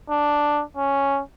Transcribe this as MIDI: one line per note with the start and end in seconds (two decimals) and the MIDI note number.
0.10 0.63 62
0.77 1.21 61